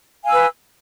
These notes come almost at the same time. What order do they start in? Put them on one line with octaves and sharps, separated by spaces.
F5 G#5 E6 B4